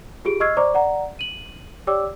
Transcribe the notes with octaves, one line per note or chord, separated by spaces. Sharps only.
F4 G4 G#4 D7
D#5 C#6 E6 F6 G#6 C7
C5 D5 A#5 C#6 D6
D5 F#5 A#5
D#7 F#7
G4 C#5 D5 G5 D6 E6